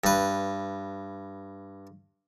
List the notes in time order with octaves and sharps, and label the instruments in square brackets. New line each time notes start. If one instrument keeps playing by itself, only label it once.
[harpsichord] G2 B4